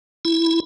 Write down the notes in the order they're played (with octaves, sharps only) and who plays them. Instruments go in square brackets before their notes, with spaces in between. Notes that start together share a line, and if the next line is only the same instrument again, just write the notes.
[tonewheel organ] E4